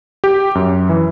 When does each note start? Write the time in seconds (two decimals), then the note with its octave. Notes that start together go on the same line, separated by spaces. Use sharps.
0.24 G4
0.55 F#2
0.89 E3